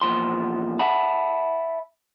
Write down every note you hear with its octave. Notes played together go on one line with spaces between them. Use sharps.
E2 A#2 F3 C6
E5 F#5 A5 B5